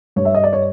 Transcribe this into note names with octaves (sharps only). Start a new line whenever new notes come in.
G2 C#5
E5
D#5
D5
C#5